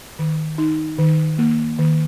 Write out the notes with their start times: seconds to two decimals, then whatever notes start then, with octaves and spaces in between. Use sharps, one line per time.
0.19 D#3
0.58 D#4
0.99 D#3
1.38 A#3
1.79 D#3